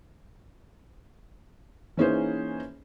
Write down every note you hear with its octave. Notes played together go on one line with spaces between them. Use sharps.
E3 A#3 C#4 D#4 G#4 C5